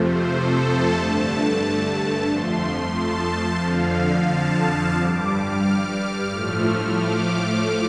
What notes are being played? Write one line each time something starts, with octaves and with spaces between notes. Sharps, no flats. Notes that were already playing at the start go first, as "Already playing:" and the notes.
Already playing: F2 C3 F3 A3 C5
A4
A5
G2 D3 A3
F2 F3 A3 C6
A5
F2 D3 F3 F5
A5
G2 G3 D6
F6
A2 F3 A3
D6